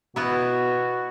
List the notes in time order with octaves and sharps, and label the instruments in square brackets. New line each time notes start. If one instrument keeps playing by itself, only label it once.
[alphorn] B2 [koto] B3 E4 [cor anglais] F#4